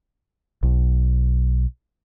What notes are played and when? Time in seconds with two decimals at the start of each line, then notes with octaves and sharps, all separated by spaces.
0.63 B1